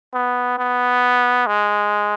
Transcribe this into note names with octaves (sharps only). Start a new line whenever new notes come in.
B3
B3
G#3